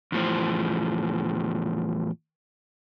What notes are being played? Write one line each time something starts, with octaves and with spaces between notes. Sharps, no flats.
E2 A2 F3 C5